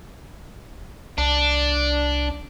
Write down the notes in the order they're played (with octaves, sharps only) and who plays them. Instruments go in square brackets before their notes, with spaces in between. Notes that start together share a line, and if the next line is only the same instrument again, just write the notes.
[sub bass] C2 [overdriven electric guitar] D4